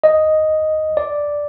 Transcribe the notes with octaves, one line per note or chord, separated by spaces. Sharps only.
D#5
D5